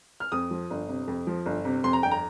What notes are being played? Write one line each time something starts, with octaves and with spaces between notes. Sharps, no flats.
F6
F2 D#6
F3
G1
C3
F2
F3
G1
C3
F2 C6
A#5
G1 G5
A#5